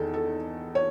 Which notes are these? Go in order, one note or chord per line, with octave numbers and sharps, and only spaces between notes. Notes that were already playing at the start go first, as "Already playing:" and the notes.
Already playing: E2 D#3 A4
A4
C#5